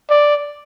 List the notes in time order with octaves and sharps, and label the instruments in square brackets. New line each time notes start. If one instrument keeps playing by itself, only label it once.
[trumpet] D5